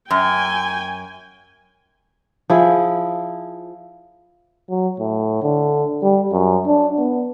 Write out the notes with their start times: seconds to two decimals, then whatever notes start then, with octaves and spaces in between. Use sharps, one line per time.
0.10 F#2 G5 G#5
2.50 F3 E4 G#4
4.70 F#3
4.99 A2
5.43 D3
6.02 G3
6.32 F#2
6.67 D4
6.98 B3